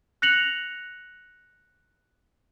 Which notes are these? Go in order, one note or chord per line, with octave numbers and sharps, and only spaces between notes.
F#6 A#6 C#7 F7 F#7